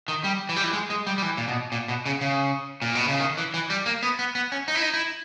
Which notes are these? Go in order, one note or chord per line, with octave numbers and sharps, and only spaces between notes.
D#3
G3
E3
G3
E3
G#3
G#3
G3
G3
E3
A#2
B2
A#2
B2
C#3
C#3
A#2
B2
C#3
D#3
E3
E3
G3
A#3
B3
B3
B3
C#4
D#4
E4
D#4
E4